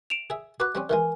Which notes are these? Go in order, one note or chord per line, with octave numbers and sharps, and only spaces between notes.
D7 E7 F7
G#4 E5
F#4 B4 D6 F#6
G3 C4 C#4
D#3 E3 G#3 A#4 G#5